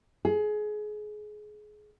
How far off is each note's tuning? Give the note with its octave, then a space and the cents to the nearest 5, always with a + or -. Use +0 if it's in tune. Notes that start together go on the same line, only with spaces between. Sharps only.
G#4 +25